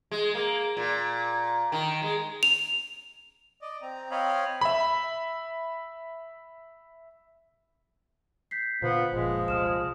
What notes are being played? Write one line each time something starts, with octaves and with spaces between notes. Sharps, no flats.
G#3
A#3
A#2
D#3
G#3
F7
D5 D#5
C4 A#5
C4 C#5 D#5 F5 B5
E5 B5
G6 B6 C7
A#2 D3 B3 F4 C5
F#1 A#2 F3 G#3
C2 D#6 F6 E7